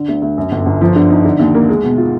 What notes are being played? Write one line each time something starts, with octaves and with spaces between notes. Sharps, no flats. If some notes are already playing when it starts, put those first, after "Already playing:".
Already playing: D3
D2
D2
F#2
G1
G1
F3
D3
D#4
D3
D#2
A#3
G#3
B2
F4